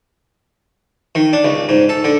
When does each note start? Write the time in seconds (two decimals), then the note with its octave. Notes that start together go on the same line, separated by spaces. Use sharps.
1.15 D#3
1.33 D4
1.44 C#2
1.69 G#2
1.89 A4
2.04 D3